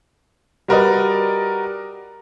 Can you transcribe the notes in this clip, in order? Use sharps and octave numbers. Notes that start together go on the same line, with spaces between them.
G3 F#4 A#4 B4 D5 D#5